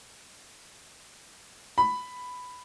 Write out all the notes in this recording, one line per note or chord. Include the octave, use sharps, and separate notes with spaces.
B5